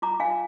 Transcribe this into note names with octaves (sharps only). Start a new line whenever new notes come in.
F4 A#5 D6
F4 F5 G#5